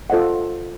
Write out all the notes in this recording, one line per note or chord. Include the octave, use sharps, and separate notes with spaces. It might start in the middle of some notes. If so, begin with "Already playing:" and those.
F4 A4 C5 D#5 F#5